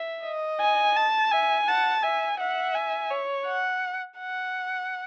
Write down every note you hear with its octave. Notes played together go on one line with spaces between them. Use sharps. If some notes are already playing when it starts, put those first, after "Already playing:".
Already playing: E5
D#5
G#5
A5
E5 G#5
F#5 A5
E5 G#5
E5 F#5
G#5
C#5
F#5
F#5